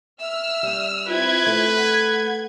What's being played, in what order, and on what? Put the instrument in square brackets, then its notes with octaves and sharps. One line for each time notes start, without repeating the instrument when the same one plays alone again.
[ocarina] E5 [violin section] E6 F6
[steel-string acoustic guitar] G3 C#4
[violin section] C4 E4 G#6 [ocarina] F4 [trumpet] B4
[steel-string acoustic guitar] A3
[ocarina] F#5 [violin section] G#6